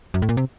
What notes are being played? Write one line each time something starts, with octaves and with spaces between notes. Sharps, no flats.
F#2
A2
A#2
C3